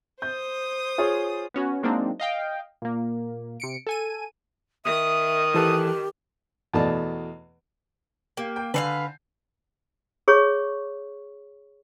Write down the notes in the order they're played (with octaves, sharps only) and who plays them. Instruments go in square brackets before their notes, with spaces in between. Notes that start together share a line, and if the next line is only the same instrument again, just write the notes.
[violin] C5 D#6 [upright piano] G6
[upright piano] F4 G#4 C#5
[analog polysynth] B3 C#4 F#4
F#3 G#3 A#3 C4 D4 D#4
D#5 F5 G5
A#2 A#3
C3 C#7 D7
A4 G#5 D#7
[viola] D#3 [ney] E5 [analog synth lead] D#6
[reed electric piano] E3 A4 F#6 [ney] G4
[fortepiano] E2 B2 A3 D5 A5
[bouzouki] A#3 [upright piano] G4
[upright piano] G5 G6
[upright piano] D3 G#5 C7 [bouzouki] B4 C#5 F5
[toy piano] G#4 C#5 C#6